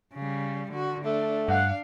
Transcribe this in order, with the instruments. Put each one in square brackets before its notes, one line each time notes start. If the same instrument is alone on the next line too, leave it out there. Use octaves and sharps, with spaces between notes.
[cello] C#3 G3
D3 F#4
[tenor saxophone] A3 [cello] D4
[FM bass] G2 [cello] D4 F5 [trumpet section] F#5